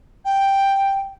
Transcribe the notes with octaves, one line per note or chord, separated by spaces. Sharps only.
G5